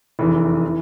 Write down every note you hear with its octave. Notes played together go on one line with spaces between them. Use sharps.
F1 E2 E3
E3